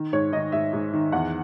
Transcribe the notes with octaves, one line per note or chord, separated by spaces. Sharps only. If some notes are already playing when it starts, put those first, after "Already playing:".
Already playing: D#3
G#2 C#5
D#3 D#5
G#2 E5
G#2
D#3
E2 F#5